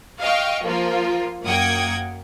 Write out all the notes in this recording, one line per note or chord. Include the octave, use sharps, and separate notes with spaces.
D#5 F5 G5 C#6
F3 A#3 F4
F#2 A#3 F#5 G5 D#6 G#6